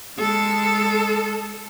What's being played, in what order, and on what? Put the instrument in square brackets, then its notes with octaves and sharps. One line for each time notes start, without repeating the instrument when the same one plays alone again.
[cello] G#3 A4